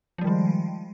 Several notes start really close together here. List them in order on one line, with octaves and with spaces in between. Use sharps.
F3 G3 D#3 G#3